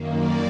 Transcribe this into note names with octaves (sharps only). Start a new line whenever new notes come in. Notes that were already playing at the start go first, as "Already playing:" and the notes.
Already playing: F#2 D#3 A#3
D5